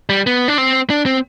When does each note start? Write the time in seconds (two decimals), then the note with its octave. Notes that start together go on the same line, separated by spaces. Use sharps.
0.09 G3
0.27 B3
0.48 D4
0.58 C4
0.90 D4
1.06 C4